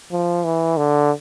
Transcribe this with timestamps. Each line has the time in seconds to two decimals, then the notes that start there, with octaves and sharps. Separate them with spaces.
0.11 F3
0.44 E3
0.77 D3